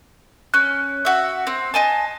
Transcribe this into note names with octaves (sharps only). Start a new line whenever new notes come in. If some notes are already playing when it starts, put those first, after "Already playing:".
C#4 F#6
F#4 E5
C4
D#5 G#5 A5